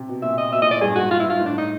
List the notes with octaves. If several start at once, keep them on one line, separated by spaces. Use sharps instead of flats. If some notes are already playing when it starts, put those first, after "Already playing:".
Already playing: C3
B2
A#2 E5
D#5
B2 E5
A#2 D#5
A2 D5
G2 G#4
G#2 F#4
F4
G2 E4
G#2 F4
A2
D4
D#4